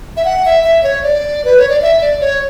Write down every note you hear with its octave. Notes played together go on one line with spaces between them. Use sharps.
E5
F#5
E5
E5
C#5
D5
B4
C#5
D5
E5
D5
C#5